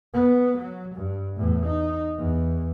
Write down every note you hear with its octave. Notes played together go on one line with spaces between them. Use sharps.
B3
F#3
G2
E2 A2
D#4
E2